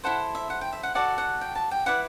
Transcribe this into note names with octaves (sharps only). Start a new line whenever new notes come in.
E4 A4 C5 F#5
E5
F#5
G5
E5
F#5
F#4 A4 D5 F#5
F#5
G5
A5
G5
E4 B4 D5 F#5